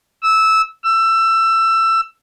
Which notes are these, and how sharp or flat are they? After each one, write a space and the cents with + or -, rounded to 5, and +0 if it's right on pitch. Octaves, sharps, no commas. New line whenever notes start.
E6 -15
E6 +20